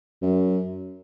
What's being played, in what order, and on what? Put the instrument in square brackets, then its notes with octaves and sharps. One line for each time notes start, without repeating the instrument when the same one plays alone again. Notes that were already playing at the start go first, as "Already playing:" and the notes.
[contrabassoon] F#2